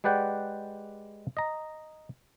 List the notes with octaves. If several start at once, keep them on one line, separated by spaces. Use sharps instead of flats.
G#3 G4 B4 D5 F#5 G5
D#5 A#5